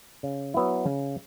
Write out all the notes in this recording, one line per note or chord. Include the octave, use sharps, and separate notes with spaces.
C#3
F#3 B3 E4
C#3